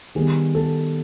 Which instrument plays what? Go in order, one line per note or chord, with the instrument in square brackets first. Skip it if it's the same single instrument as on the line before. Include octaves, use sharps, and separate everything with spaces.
[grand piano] D#3 G3 B3 G#4
A4